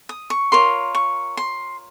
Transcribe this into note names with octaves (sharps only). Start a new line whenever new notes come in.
D#6
C#6
F4 A#4 C#5 C6
C#6
C6